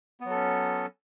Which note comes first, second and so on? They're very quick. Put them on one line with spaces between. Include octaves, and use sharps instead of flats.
B3 F#3 A4 C#4